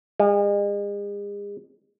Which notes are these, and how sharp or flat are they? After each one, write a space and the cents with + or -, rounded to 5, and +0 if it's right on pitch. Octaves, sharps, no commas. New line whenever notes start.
G#3 -40